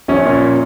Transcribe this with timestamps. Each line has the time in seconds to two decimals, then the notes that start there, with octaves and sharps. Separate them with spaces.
0.08 A#1 C#4
0.25 A#2